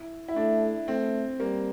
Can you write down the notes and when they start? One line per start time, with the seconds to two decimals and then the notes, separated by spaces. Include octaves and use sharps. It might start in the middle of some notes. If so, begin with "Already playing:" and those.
Already playing: E4
0.28 E4
0.36 A3 D4
0.88 A3 C4
1.40 G3 A#3